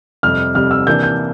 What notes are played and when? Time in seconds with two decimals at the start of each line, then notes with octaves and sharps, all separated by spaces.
0.23 F2 C3 G3 F6
0.55 F2 C3 G3 F6
0.71 E6
0.87 C3 E3 A#3 D4 G6
1.03 G6